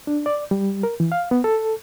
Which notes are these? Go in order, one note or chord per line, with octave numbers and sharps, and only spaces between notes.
D4
D5
G3
A#4
E3
F5
B3
A4